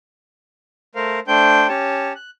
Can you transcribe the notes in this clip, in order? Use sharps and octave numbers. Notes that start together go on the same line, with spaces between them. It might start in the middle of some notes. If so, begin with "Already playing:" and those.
A3 A#4 C5 F5
A3 D4 C5 G5 G6
C#4 G4 C#5 A5
F#6